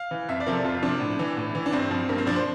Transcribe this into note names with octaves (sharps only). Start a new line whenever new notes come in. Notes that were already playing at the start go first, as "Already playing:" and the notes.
Already playing: F5
E3
F2 E5
D5
C3 F3 A#4
A4
F2 F4
C3 F3 D4
A2
E3
A2
E3
D4
G2 C4
F3
G2 A#3
C4
F3 D4
C5